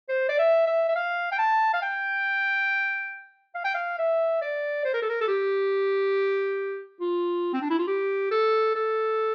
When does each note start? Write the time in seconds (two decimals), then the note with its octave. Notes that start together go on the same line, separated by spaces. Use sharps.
0.09 C5
0.29 D5
0.38 E5
0.67 E5
0.88 E5
0.95 F5
1.32 G5
1.38 A5
1.73 F5
1.82 G5
3.54 F5
3.64 G5
3.74 F5
3.98 E5
4.41 D5
4.85 C5
4.93 A#4
5.02 A4
5.09 A#4
5.21 A4
5.27 G4
7.00 F4
7.53 C4
7.61 D4
7.70 E4
7.79 F4
7.87 G4
8.31 A4
8.74 A4